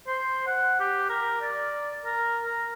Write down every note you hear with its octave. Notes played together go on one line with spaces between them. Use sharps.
C5
F#5
G4
A#4
D5
A#4
A#4